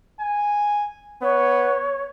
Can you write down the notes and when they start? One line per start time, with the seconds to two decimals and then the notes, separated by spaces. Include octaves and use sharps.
0.20 G#5
1.23 B3 C#5